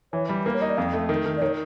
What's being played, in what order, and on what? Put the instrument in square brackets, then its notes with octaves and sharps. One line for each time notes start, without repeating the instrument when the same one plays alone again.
[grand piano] E3 [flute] C#5
[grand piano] G3
[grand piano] A#3 [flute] B4
[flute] C#5
[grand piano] D#4 [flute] D#5
[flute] D5
[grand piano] F2 [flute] F5
[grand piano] A3
D#3
D#3
[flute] D5
[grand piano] D#3 [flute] C#5